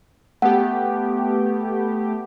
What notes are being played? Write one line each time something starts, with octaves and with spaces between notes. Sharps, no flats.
A3 B3 G4 F#5